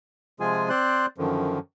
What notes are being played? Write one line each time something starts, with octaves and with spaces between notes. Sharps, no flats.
C3 F3 G#3 F4 G#4 G#5
C4 C5 D5 C6 F#6
F#2 D3 D#3 F3